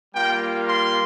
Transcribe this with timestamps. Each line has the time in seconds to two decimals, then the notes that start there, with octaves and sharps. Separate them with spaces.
0.14 G3 A#3 F4 G5
0.68 C6